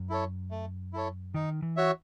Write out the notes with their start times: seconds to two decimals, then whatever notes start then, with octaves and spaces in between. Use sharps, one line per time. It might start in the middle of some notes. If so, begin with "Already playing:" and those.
Already playing: F#2
0.09 E4 A4 C#5
0.51 A3
0.93 E4 A4 C#5
1.34 D#3 D#4
1.62 E3
1.76 F#4 C#5 E5